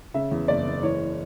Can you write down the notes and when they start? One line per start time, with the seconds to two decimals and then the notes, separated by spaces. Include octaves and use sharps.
0.14 C#3 E5
0.31 E2
0.48 F#1 D5
0.66 F#1
0.83 E3 C#5